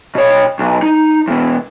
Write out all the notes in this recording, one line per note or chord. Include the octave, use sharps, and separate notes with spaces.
B2 C#5
B1
D#4
E2 B2